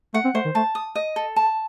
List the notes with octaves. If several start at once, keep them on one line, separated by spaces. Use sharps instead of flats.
A3 F#5
C4
A3 C5
D#3
A3 A5
D#6
D#5
A4
A5